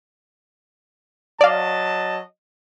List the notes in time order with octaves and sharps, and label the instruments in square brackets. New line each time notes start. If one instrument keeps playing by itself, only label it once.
[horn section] F#3 D#5 A5 [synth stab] D5 F5